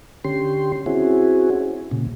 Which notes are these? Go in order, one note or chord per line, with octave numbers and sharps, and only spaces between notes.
D3 C#4 G4 C6
C4 C#4 E4 F#4 G#4
A#2 C#3